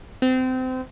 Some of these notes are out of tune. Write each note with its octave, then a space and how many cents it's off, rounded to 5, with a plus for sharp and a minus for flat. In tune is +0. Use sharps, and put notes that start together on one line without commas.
C4 -25